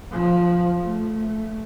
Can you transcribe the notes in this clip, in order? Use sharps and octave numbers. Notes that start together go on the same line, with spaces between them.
F3
A3